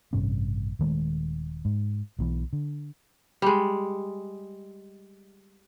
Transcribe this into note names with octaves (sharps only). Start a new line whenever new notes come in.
A1 G2 C3 C#4
D#1 D#3 G#3 A3
G#2
B1 B2 E3
D3
G3 G#3